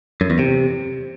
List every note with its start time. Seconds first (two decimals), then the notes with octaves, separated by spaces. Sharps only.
0.21 F#2
0.30 E2
0.39 C3